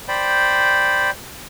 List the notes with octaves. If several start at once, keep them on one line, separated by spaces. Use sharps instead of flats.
C5 D5 G5 B5